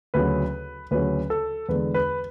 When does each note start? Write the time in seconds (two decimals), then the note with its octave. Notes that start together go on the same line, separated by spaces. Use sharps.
0.14 D2 C#3 F#3 C#4 B4
0.91 D2 C#3 F#3 C#4 B4
1.30 A4
1.69 E2 D3 G#3 B4
1.94 B4